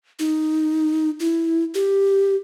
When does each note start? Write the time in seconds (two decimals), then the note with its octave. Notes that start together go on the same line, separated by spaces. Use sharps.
0.19 D#4
1.20 E4
1.75 G4